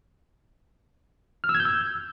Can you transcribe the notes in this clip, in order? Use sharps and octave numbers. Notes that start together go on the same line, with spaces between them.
F6
E6
G#6
G6
E6